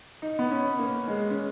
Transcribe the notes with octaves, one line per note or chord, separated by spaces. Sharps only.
D#4
B3
C#4
A#3
G#3
C#4